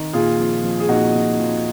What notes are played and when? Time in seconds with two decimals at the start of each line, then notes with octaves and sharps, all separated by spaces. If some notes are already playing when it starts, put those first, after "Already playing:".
Already playing: D#3
0.13 A#2 F4 G#4
0.39 F3
0.63 F3
0.80 G#4
0.89 A#2 D#4 F#4
1.14 A#2
1.39 F3